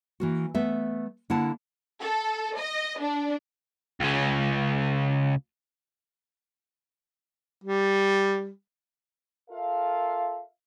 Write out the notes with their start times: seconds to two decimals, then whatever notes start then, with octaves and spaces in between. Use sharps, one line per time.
0.20 E3 A#3 F#4
0.55 A3 B3 E5
1.30 D3 A#3 E4 F#5 A5
2.02 A4
2.57 D#5
3.01 D4
4.00 C#2 C#3
7.64 G3
9.51 F4 A4 A#4 E5 F5